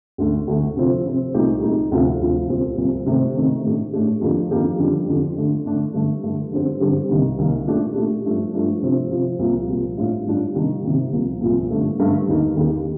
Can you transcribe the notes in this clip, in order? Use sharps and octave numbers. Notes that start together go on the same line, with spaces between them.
D2 D3 A3
D2 D3 A3
C3 F3 C4
C3 F3 C4
C2 A#2 A3 D#4 G4
C2 A#2 A3 D#4 G4
D2 C3 F3 C4 F4
D2 C3 F3 C4 F4
C2 A#2 G3 C4
C2 A#2 G3 C4
C3 D#3 A3 C4
C3 D#3 A3 C4
A2 A3 D4 G4
A2 A3 D4 G4
F2 D#3 A#3 D4 G4
F2 D#3 A#3 D4 G4
F2 D3 G3 D4
F2 D3 G3 D4
D3 A3 D4
D3 A3 D4
G2 D3 A3
G2 D3 A3
G2 D3 G3 C4 G4
G2 D3 G3 C4 G4
C2 C3 D#3 A#3
C2 C3 D#3 A#3
A#2 A3 D4 G4
A#2 A3 D4 G4
G2 F3 A3 D4
G2 F3 A3 D4
C3 F3 C4
C3 F3 C4
C2 A#2 F3 A#3
C2 A#2 F3 A#3
A2 G3 D4 F4
A2 G3 D4 F4
C3 D#3 G3 A#3
C3 D#3 G3 A#3
C2 A#2 F3 A#3
C2 A#2 F3 A#3
G2 D3 A3 D4
G2 D3 A3 D4
D#2 D#3 A#3 D#4 G4
D#2 D#3 A#3 D#4 G4